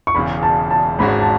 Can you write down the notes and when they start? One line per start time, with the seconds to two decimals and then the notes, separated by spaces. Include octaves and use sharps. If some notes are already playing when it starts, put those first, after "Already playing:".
0.07 C#6
0.15 E1 E2 C#3 B5
0.43 A5
0.71 A5
0.98 G#1 G#2 G#3 C#4 F#4 B5
1.21 A5